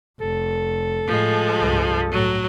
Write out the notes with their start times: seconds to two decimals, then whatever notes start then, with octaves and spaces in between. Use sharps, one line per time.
0.21 F1 A4
1.08 A2 F3 G#3
1.57 C2 G2
2.12 A2 F#3